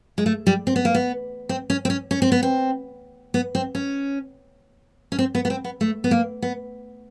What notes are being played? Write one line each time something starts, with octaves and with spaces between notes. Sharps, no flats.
G#3
A3
G3
C4
B3
A#3
B3
C4
C#4
C4
C#4
C#4
C4
B3
C4
B3
C4
C#4
C#4
C4
B3
B3
C4
B3
A3
B3
A#3
B3